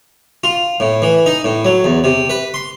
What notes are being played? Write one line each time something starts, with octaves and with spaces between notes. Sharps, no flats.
F4
A2
E3
D#4
A2
F#3
E2
C3
B4
C6